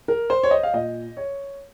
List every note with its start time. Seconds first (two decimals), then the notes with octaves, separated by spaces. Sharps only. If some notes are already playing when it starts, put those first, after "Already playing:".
0.08 A#4
0.30 C5
0.43 C#5
0.51 D#5
0.63 F5
0.74 A#2 D#5
1.17 C#5